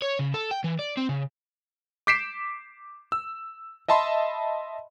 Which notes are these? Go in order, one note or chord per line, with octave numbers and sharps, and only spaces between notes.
C#5
C#3
A4
G5
E3
D5
C4
C#3
D6 G6 B6 C7 D7 E7
E6
D#5 E5 A5 B5 C6